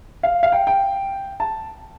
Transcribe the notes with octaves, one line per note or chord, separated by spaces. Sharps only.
F5
F5
G5
G5
A5